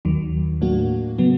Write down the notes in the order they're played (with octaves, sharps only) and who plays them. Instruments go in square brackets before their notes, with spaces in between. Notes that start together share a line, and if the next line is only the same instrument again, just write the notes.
[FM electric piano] D#2 D#3 F#3
A2 F#3 A#3 D4 F#4
C#3 F#3 B3